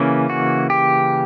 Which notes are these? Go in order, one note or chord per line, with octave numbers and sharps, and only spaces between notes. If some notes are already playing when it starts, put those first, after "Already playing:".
Already playing: C#3 E3 A#3 C#4
F#4
G4